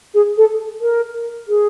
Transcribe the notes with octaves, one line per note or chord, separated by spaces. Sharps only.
G#4
A4
A#4
G#4